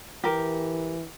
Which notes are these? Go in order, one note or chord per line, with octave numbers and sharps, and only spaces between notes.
E3 G4 A#4